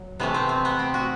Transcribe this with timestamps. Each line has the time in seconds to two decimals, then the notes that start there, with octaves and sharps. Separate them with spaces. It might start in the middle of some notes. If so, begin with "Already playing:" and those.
Already playing: F#3
0.20 C3 E3 A3 B3
0.34 C4
0.49 C4
0.65 B3
0.79 C4
0.94 F#4